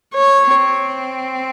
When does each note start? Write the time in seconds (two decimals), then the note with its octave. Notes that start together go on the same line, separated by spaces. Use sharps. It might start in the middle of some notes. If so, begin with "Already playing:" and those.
0.14 C#5
0.46 C4